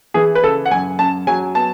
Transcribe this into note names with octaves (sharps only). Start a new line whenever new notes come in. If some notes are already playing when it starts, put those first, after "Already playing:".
E3 G#4
B4
C#3 A4
F#5
F#2 G#5
F#2 A5
F#3 G#5
B3 A5